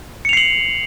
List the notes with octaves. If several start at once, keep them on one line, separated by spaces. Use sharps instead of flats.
C7 C#7 F7 F#7